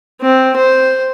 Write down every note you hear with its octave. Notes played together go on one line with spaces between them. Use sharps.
C4
C5